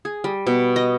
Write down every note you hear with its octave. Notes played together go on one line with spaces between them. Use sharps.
G#4
G3
B2
D#5